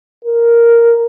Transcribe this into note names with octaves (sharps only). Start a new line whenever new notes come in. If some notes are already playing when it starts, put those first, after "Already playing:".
A#4